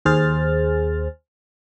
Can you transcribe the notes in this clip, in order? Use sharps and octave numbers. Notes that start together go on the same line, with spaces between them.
D#2 G#4 C5 F6 A6